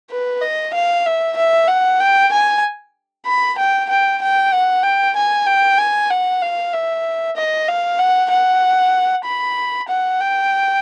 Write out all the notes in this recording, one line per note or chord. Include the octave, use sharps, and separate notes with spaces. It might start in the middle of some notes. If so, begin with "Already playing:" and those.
B4
D#5
F5
E5
E5
F#5
G5
G#5
B5
G5
G5
G5
F#5
G5
G#5
G5
G#5
F#5
F5
E5
D#5
F5
F#5
F#5
B5
F#5
G5